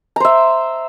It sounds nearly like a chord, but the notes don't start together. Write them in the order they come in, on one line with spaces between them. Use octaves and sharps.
A#5 C5 E5